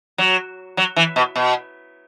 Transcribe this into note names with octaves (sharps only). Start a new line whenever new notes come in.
F#3
F#3
E3
B2
B2